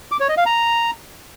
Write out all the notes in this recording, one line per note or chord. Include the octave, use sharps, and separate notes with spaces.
D6
C#5
D#5
F5
A#5